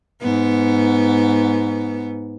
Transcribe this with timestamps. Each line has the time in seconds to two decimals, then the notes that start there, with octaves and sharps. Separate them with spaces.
0.22 G#2 B3